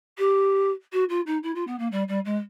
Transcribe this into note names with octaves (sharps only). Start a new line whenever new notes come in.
G4
F#4
F4
D#4
E4
F4
B3
A#3
G3
G3
G#3